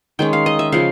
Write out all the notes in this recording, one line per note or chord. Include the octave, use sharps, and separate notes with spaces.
D#3 G#3 C#4 G5
F5
D#5
E5
C#3 F3 G#3 F5